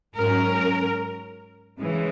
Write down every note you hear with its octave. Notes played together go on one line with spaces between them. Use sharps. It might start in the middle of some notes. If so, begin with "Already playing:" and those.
G#2 F#3 C#4 A#4
C#3 E3 G#3